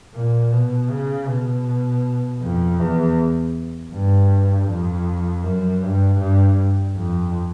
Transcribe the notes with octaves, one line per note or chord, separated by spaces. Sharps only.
A#2
B2
C#3
B2
F2
E2
G2
F2
F#2
G2
G2
F2